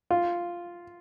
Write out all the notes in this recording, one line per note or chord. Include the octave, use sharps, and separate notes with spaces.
F4